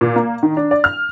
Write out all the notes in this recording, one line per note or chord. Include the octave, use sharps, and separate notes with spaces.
A#2
A#3
D#3
D4
D5
F6